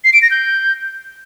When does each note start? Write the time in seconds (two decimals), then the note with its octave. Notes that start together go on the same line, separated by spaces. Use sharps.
0.04 C7
0.13 D7
0.22 A#6
0.31 G6